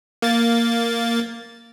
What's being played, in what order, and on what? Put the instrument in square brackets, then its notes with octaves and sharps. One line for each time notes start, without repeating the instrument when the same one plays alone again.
[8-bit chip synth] A#3 A6